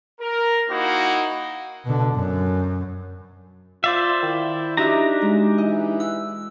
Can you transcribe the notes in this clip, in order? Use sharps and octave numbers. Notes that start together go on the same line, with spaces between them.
A#4
A#3 D#4 E4 F#4 C5
B2 D3
F#2
F4 C5 D5 E5 F5
D#3 E4
D4 D#4 F#4 G4 E5 A#5
G#3
E3 D#5
F#5 E6